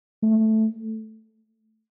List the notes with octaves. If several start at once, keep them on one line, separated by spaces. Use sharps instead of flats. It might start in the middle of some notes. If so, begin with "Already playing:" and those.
A3